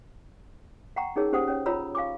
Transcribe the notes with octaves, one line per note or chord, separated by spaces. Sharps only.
F#5 G5 A#5 C#6
C#4 D#4 G#4 A#4 C#5 E6
C#4 G4 C5 F#5 D#6
C#4 C#5
F4 C#5 A#5 B5 E6
F5 G#5 C#6 D6